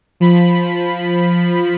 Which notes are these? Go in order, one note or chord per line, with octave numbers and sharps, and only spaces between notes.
F3 B5